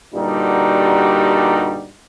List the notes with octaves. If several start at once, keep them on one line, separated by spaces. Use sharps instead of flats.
G2 A#2 D3 G3 D#4 F#4